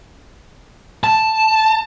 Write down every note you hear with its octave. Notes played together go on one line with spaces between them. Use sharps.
A5